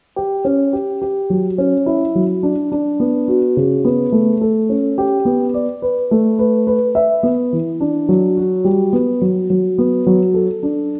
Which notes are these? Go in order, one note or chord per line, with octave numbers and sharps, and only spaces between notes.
G4
C#4
G4
G4
F#3
C#4
E4
F#3
D4
D4
B3
F#4
C#3
B3
A3
A4
C#4
G4
B3
D5
B4
A3
B4
B4
E5
B3
E3
D4
F#3
F#4
G3
B3
F#3
F#3
B3
F#3
A4
D4